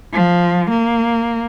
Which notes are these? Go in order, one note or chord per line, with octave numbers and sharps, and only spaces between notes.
F3
A#3